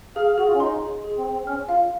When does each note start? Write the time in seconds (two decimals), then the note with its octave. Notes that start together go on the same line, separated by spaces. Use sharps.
0.16 G#4 F5
0.26 F5
0.38 F#4 G#4
0.48 F4
0.54 C#4
0.60 D#4 C6
0.82 G#4
1.04 G#4
1.18 C4
1.25 G#4
1.33 C4
1.47 C#4 F6
1.69 F4 F5